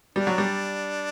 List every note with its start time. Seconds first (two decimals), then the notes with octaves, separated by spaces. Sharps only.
0.15 G3 D4
0.27 F#3
0.38 G3